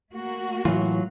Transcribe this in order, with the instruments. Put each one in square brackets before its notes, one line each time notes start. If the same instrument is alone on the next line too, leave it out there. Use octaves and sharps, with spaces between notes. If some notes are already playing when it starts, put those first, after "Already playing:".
[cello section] A3 A#3 F#4
[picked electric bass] A2 E3 [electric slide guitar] F#3 F4